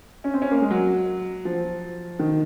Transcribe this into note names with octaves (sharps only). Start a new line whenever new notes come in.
C#4
C4
C#4
A#3
G#3
F#3
F3
D#3